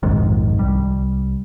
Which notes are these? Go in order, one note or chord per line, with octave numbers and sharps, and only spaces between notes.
A#1 F2 G#2 D#3
C2 G3